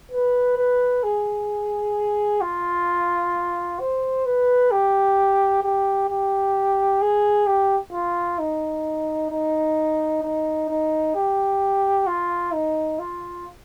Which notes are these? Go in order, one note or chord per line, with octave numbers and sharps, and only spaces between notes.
B4
B4
G#4
F4
C5
B4
G4
G4
G4
G#4
G4
F4
D#4
D#4
D#4
D#4
G4
F4
D#4
F4